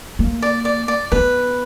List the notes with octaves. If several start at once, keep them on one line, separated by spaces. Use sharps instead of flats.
A#3
D5
D5
D5
B3 B4